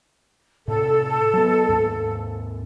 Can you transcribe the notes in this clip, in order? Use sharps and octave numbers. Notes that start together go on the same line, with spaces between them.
A2 C3 A4
F#3 B3
D#2 G#2